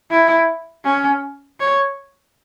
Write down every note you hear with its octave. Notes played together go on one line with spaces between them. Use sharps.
E4
C#4
C#5